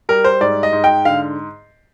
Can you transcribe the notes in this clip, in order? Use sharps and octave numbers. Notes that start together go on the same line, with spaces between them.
G3 A#4
C5
G#2 D5
D#5
G#2
G5
D3 F5